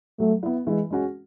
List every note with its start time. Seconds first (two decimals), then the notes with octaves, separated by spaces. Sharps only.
0.19 F#3 A3
0.43 B3 E4
0.67 E3 G#3
0.90 G#3 C#4 F#4